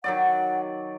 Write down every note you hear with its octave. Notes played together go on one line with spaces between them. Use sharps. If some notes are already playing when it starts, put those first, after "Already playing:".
D#3 F#3 D5 F#5